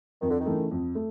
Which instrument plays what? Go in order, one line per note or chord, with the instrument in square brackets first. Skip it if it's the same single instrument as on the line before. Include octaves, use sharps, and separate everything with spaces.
[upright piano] F2 [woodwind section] D#3
[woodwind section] D3
D#3
[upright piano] C#3 E3 A3
F2
A3